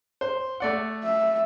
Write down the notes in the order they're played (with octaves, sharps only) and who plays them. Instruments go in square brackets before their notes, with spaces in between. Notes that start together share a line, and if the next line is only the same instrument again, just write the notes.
[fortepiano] C5
A3 D5 F#5
[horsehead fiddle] E5